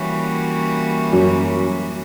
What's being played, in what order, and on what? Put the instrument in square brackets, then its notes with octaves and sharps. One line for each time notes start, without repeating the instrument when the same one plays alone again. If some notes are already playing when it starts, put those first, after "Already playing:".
Already playing: [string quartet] E3 G3 A#3 C#4 F#4
[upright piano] F#2